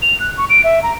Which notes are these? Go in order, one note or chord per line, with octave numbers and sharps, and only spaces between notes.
F7
F#6
C#6
D7
E5
A#5